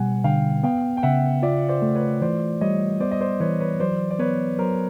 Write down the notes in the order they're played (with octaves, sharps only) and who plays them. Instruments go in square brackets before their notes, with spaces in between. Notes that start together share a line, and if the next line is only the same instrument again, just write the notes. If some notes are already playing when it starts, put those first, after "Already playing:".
Already playing: [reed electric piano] B2 G3 [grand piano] F#5 G#5
[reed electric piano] D3 [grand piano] F5 G5
[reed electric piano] B3 [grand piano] F5 G5
[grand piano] G5
[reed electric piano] C#3 [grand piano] E5 F#5
[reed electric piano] F4 [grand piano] D5 E5
[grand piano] C5 D5
[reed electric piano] A3
[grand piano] B4 C#5
[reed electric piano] E3 [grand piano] C5 D5
[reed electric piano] G3 [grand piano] C#5 D#5
[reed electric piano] B3 [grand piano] C5 D5
[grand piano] D#5
C5 D5
[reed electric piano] E3 [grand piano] B4 C#5
[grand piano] B4 C#5
[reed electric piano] F#3 [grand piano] C5 D5
[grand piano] D5
[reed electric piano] B3 [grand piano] B4 C#5
[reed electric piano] F#3 [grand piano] A#4 C5